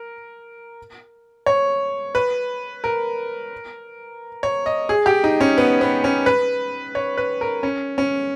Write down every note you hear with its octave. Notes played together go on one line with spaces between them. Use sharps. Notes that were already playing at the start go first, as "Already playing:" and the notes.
Already playing: A#4
C#5
B4
A#4
C#5
D#5
G#4
G4
D#4
C#4
B3
B3
C#4
B4
C#5
B4
A#4
C#4
C#4